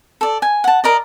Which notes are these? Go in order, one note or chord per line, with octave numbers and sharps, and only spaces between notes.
A4 D5
G#5
F#5 A5
A#4 D5 D#5